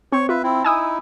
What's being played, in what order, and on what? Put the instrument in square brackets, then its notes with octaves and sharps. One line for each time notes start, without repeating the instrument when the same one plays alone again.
[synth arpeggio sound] C4 [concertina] C#5 C#6
[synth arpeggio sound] F4 [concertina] B4 E5
[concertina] C4 E4
[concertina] D#4 E4 [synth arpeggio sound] G#5 D#6 E6